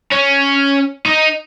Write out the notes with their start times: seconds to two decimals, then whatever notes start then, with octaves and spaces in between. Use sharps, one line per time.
0.11 C#4
1.06 D#4